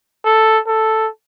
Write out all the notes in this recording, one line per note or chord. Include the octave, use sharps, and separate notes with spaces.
A4
A4